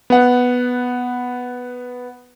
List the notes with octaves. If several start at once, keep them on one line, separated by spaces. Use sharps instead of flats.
B3 F#5